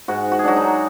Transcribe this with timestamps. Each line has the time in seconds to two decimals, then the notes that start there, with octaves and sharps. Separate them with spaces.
0.08 G#2 F#4
0.32 F#4
0.39 G#4
0.44 F#3 D4 F#4
0.56 D#4